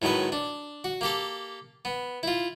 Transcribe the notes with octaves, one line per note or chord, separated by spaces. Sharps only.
A2 D#3 F#3 G#3 B4
D4
F#4
A#3 G4 A4
B3
E4 F4